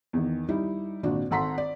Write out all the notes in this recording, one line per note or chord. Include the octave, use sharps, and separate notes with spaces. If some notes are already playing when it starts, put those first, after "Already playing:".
E2 D#3
G3 D#4 E4
G#1 A#2 D4 F#4
G#1 A4 F#5 A#5 C6 B6
D5